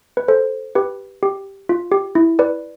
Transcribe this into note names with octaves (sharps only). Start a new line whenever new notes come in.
B4
A4 C5
G4 B4
G4
F4
G4
E4
B4 D5